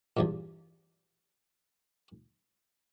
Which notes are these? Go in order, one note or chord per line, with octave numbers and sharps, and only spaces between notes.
E2 G2 A#2